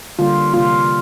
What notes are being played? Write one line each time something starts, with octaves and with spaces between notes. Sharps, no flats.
D3 G3 A#3 F4
C3 A#3 F4